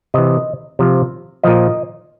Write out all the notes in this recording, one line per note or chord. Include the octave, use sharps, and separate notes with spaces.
C3 E3 D#5
C3 F3
A#2 F3 D#5